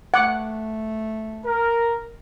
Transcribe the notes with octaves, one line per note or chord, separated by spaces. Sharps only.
A3 F#5 D6
A#4